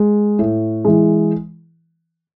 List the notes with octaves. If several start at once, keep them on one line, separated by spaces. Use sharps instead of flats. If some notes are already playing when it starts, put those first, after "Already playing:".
Already playing: G#3
A2
E3 G#3